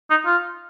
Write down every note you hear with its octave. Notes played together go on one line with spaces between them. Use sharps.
D#4
F4